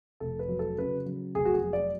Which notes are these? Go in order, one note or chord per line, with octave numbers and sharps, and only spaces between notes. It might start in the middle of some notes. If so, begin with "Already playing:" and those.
F1 A4
B4
F#3
A4
C#3 B4
F#3
F1 G#4
F#4
G#4
F#3
D5